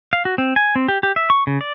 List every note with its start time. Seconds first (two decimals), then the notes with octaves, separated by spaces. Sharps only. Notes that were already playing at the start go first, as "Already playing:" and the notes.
0.13 F5
0.25 F#4
0.38 C4
0.56 G#5
0.76 C4
0.88 G4
1.03 G4
1.16 E5
1.30 C#6
1.47 C#3
1.61 D5